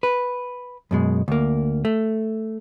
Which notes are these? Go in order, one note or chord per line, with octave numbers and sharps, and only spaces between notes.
B4
F#2 B2 G#3
D2 A#3
A3